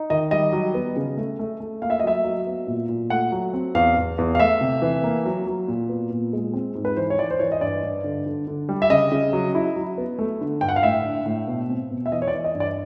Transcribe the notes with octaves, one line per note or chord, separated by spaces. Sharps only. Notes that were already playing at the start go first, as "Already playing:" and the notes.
Already playing: D#4
D#3 D#5
G3 D#5
F#3
B3
C#3
A3
A3
A3
A#3 F5
E5
D#5
F#3 E5
F#3
B3
A#2
A#2
A3 F#5
F#3
C4
E2 F5
E2
E2
F5
A3 E5
C3
E3
A#3
F#3
F#3
A#2
B3
A#2
G#3
C4
G#2
B4
E3 C5
C#5
E3 D5
C5
E3 C#5
D#5
G2 D5
G2
D3
D3
D3
G3
E5
C#3 D#5
C#3
F#3
E4
F#3
B3
A3
D3
G2 G5
F#5
F5
A2 E5
D4
A2
B2
C4
B2
E5
E3 D#5
C#5
D5
E3
D#5
G2
D5